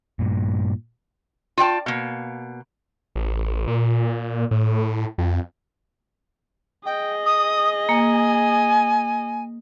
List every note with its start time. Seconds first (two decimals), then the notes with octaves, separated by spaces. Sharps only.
0.19 G2 A#2
1.57 F4 D5 G5 A5
1.86 B2 A#3
3.16 A1
3.67 A#2
4.51 A2
5.18 F2
6.86 G#4 D#5 G5
7.26 D#6
7.89 A#3 G#5